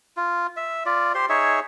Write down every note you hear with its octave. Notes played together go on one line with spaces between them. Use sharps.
F4
E5
F4 D5
G4 C5 C6
D#4 G#4 C#5 E5